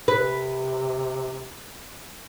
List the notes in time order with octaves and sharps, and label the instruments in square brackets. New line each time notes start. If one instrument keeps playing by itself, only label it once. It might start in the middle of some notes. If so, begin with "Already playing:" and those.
[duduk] C3 [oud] B4